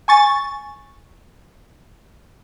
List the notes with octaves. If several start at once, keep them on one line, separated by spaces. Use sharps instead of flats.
G#5 C#6 A6